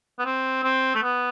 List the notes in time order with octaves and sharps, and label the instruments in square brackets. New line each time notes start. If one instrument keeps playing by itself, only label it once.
[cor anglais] B3
C4
C4
A3
B3